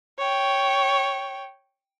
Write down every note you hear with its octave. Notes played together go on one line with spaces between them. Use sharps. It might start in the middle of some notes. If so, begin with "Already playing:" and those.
C#5 G5